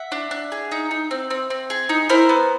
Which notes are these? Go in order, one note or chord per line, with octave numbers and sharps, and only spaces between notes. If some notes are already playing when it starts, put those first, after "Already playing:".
Already playing: E5 F#5
D4
D4
G#4
D#4
D#4
C4
C4
C4
G#4
D#4
E4 A#4 C5
B3